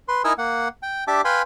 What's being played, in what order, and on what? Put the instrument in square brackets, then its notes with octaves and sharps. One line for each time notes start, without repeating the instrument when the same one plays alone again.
[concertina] B4 C6
D#4 E4 A#4 D#5 G#5 E6
A#3 F#5
G5
D4 G4 E5 A5 D6
B4 F5 G5 G#5 B5 C6